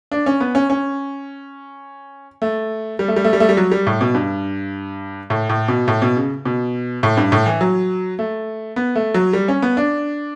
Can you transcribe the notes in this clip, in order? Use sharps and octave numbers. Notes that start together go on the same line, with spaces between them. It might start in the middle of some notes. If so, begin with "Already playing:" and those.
D4
C#4
B3
C#4
C#4
A3
G3
A3
G3
A3
G3
A3
G3
F#3
G3
A2
B2
G2
A2
A2
B2
A2
B2
C#3
B2
A2
G2
A2
E3
F#3
A3
B3
A3
F#3
G3
C#4
B3
D4